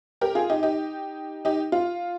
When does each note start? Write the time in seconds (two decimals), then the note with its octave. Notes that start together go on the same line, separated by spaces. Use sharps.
0.21 G4 A#4
0.35 F4 G#4
0.50 D#4 G4
0.63 D#4 G4
1.45 D#4 G4
1.72 F4